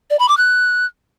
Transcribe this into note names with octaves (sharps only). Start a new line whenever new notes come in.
D5
B5
D6
F#6